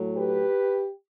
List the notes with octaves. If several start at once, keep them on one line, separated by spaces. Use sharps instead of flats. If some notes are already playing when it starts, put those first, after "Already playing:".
Already playing: A2 F#3 A3
G4 B4